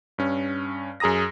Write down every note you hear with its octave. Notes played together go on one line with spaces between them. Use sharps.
G2 C#4
F#2 G#4 A#5 D#6 A#6